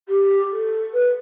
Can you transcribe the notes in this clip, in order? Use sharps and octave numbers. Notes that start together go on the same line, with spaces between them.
G4
A4
B4